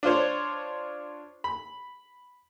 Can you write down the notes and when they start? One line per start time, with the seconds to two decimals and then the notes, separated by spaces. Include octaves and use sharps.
0.03 D4 F4 C5 C#5
1.44 B5